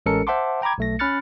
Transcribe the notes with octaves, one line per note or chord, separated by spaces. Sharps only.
A1 G#3 C#4 A4 A#4 C#7
C5 E5 F#5 A5 C6 D6
G5 A#5 B5 D6 G#6
B1 A3 A#6
C#4 B5 F6 F#6 A6 C#7